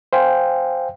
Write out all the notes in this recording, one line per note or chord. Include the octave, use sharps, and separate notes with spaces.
C5 F5 G5 G#5